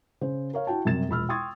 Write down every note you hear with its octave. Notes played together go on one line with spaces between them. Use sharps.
C#3 C5
A#4 C#5 F5
E4 F#4 G5 A5
F#2 C3 F#3 G3 A6 E7
E1 A#1 B5 E6 F6
G5 C6 C#6 D#6 G#6 A6